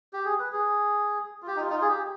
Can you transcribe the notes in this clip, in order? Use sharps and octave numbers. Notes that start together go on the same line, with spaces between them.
G4
G#4
B4
G#4
F4
G4
D#4
F4
D#4
F4
G#4
G4